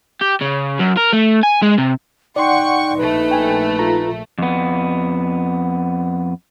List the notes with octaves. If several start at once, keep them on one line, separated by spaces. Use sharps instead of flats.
G4
C#3
F#2
A#4
A3
G#5
G#3
C3
D#4 D5 F#5 G5 C6 C#6
A#1 A3 B4
G5 G#5
F4 A4 A#5
F2 B3